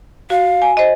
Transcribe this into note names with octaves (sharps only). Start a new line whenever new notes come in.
F#4 F5
G#5
C5 D#5